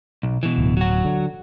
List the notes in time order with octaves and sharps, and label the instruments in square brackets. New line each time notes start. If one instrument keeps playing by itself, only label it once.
[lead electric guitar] B1
B2 E3
[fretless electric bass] D1
[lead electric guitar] F#3 F#4
[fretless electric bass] D3